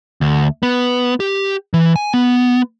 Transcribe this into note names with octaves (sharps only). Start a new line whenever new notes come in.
D2
B3
G4
E3
G#5
B3